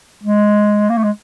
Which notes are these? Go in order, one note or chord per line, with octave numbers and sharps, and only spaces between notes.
G#3
A#3
A3
G#3